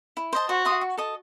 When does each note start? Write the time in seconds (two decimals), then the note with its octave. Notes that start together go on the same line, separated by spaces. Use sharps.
0.17 E4
0.33 C5 D#5 A5
0.49 F#4 C5
0.65 E5 C6 D#6
0.81 F#4
0.97 A4 D#5 A5